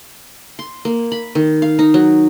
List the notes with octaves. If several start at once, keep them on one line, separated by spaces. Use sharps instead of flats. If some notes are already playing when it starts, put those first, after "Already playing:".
C6
A#3
B5
D#3
F5
D#4
F#3